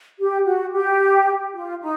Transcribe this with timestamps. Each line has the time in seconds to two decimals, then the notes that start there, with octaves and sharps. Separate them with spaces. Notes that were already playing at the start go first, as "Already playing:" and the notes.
0.19 G4
0.46 F#4
0.73 G4
1.54 F4
1.81 D#4